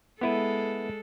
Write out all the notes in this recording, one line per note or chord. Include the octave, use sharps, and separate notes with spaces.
G#3 B3 E4 A4 B4